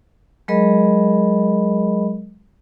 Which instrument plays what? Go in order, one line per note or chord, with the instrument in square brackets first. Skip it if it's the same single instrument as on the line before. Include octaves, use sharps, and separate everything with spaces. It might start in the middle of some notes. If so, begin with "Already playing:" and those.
[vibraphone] F#3 G#3 G#4 A#4 D#5 B5